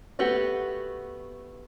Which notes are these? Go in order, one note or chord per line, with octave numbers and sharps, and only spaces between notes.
A3 B3 F#4 G4